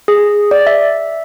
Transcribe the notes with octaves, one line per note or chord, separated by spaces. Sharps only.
G#4
D5
E5